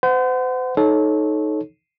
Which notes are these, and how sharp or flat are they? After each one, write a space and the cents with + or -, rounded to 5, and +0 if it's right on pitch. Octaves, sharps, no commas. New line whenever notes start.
C5 -40 F#5 +0
D#4 +0 A4 -25 C#5 -15